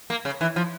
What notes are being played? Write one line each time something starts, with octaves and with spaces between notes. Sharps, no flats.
A#3
C#3
E3
F3